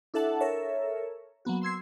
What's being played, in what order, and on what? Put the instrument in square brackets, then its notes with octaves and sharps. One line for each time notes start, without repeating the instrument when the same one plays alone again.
[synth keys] D4 E4 A4 E5 F#5 A5
A4 A#4 C#5 E5
F#3 A#3 B3 F#4
C6 E6 G#6 C7